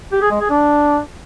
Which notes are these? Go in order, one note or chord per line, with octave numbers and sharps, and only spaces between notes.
G4
G#4
G#3
G#4
D4